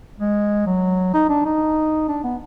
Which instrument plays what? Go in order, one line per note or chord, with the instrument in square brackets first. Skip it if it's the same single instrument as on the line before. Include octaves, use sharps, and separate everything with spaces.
[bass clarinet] G#3
F#3
D#4
D4
D#4
D4
B3